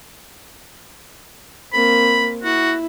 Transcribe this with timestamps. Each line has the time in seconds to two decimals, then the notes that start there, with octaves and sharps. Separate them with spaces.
1.73 A#3 C4 B5
2.43 E4 F#4